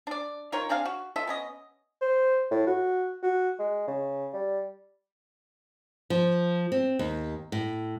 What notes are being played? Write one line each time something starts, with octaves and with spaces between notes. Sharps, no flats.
D4 D5
D#3 F4 A#4 C#5
C4 D4 G#4 F5
F#4
F4 A4 D#5 E5
B3 C#4 D#5
C5
A2
F#4
F#4
G#3
C#3
G3
F3
C4
D#2
A2